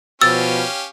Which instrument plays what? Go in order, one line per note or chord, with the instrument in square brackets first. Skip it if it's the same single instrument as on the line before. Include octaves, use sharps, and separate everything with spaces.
[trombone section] B2 F3 [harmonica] C#4 G4 F5 [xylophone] E6 [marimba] A6